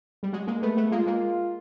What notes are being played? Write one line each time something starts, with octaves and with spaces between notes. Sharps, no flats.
G3
F#3 G#3
G#3 A#3
A3 B3
A3 B3
G#3 A#3 F4
G#3 A#3